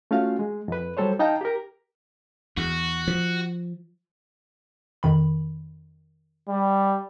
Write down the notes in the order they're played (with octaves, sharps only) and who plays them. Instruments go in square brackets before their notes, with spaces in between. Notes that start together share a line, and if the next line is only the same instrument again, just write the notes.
[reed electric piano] A3 C#4 F4 F#4 F5
G#3
F2 B4
F#3 G3 A4 C5 C#5
D#4 D#5 F5 G5 A5 A#5
G4 A#4
[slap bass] E2 [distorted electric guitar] F#4
[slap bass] F3
[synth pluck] F2 D#3 B5
[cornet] G3